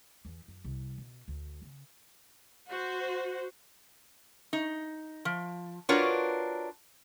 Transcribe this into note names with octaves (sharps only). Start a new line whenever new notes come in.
E2
F#2
C2
B2
D2
C#3
F#4 C5
D#4
F3
D4 F4 F#4 A#4 B4 C#5